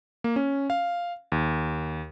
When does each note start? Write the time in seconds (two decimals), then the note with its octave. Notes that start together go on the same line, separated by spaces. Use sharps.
0.24 A#3
0.36 C#4
0.70 F5
1.32 D#2